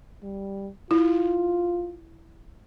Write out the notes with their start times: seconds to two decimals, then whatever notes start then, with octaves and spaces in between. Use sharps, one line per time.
0.23 G3
0.91 E4 F4